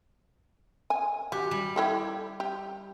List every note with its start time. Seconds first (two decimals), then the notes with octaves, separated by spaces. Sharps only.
0.90 G#5
1.32 F#4 G4
1.51 G3
1.76 E4 G4 A4
2.40 G4